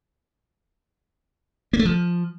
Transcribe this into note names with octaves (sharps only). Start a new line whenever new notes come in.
A#3
A3
F3